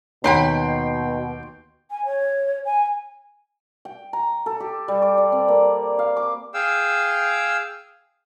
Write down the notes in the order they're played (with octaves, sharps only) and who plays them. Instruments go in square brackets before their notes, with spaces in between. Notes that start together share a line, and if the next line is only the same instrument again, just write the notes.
[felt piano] D#2 C#5 [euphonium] B2 [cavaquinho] D#4 F#5 B5 [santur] G5 C6
[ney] G#5
C#5
G#5
[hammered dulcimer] G5
A#5
A4
G4
G3
D6
D5
C4
A#3
F5
D6
[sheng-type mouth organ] G#4 F5 G5 E6